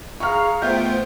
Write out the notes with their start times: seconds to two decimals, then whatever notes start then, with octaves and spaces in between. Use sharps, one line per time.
0.20 G#4 F5 A#5 C#6 F6
0.62 A3 B3 F4 C5 E5 G5 G6